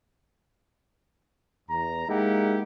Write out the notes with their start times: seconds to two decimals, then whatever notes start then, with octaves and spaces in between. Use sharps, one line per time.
1.69 E2 A#5
2.09 G#3 A#3 D#4 E4 G4 F#5